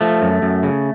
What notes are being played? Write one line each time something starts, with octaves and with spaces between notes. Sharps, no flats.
F3 A3
F#2
F#2
C#3